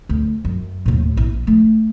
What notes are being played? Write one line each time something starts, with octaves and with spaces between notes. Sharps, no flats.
D2
F#2
D#2 A2
A#1 E4
A3